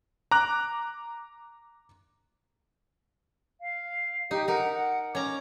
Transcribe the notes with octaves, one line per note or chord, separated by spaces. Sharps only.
A#5 D6 F#6
F5
D#4 G4
D#4 A#4 F#5
F#5
C#4 A#5 D6